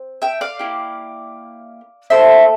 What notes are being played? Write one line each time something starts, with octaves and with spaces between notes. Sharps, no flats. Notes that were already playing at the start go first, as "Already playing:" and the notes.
Already playing: C4
E5 G5
D5 F5
A#3 E4 G4
A#3 E4 A4 C5 E5